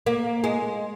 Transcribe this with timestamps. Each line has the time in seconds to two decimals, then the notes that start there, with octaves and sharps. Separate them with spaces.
0.06 A#3
0.44 G#3